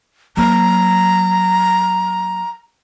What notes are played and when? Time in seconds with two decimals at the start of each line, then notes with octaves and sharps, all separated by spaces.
0.37 F#3 A#3 A#5